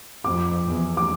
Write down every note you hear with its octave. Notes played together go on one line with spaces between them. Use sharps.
F2 D6
E2
D6